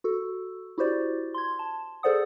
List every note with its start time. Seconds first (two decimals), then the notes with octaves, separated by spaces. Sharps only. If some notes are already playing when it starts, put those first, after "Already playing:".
0.04 F#4 A4
0.78 E4 F#4 G4 C5 D5
1.34 C6 G#6
1.59 A5
2.03 G#4 A4 C5 D5 F#5 D#6